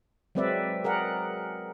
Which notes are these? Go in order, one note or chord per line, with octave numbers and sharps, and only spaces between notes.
F#3 G#3 C4 B4 D5 E5
G#4 A#4 D5 F#5